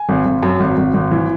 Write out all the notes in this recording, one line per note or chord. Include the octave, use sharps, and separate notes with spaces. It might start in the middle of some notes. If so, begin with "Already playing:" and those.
Already playing: G#5
G#1
G#1
F#2
G#1
G#1
G#1
E3